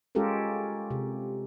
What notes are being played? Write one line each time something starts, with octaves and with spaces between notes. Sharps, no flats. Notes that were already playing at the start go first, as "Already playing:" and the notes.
G#3 C#4 F4 G4 A4 A#4
C3